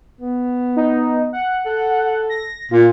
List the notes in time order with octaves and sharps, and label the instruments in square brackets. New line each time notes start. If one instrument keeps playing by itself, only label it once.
[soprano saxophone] B3
[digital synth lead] D#4
F#5
[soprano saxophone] A4
[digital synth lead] A#6
[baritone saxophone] A#2 [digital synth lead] F4